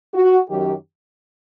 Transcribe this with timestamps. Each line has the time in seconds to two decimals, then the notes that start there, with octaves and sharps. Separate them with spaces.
0.14 F#4
0.49 F#2 D#3 F#3 G4